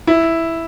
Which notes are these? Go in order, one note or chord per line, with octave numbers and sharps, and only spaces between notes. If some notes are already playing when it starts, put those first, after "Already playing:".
E4